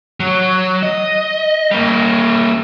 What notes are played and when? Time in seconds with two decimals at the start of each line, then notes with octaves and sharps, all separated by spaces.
0.20 F#3
0.83 D#5
1.71 G3 A#3